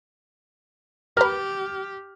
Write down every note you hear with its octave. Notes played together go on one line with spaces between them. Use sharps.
G4 A#4 B4 F6